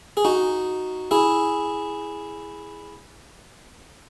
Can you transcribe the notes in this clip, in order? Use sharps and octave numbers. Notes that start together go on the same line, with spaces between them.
G#4
D#4 F#4
E4 G#4